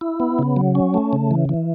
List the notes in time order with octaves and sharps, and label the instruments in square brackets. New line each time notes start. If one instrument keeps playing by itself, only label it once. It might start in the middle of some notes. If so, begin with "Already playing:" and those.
[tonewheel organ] E4
B3
C#3
F#3
C#4
A3
C#3
E3
E3